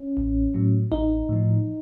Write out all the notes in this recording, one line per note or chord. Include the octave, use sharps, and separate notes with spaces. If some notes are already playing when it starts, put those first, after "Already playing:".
Already playing: C#4
A1
A2 F#3
A1 D#4
A2 F3